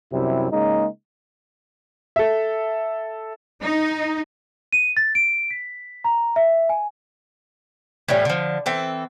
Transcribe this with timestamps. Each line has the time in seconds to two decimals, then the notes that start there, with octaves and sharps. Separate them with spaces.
0.12 F#2 C3 G3 E4
0.51 C#3 G#3 A#3 D#4
2.16 A4 E5
3.62 D#4
4.73 D#7
4.97 A6
5.15 D7
5.51 B6
6.04 A#5
6.36 E5
6.69 G#5
8.08 A2 E3 G3 C#4
8.25 D3 F3
8.66 E3 C4 A4